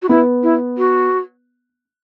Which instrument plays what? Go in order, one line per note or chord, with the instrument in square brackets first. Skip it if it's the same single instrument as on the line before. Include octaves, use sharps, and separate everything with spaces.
[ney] F#4
[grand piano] B3 [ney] E4
[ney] E4
F#4